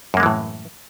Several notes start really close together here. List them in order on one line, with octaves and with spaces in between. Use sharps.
F#2 A#3 G#3 E3 A2